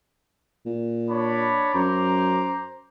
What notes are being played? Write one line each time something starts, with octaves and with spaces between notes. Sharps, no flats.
A#2
D4 C#5 B5
F#2 C5 A#5 D6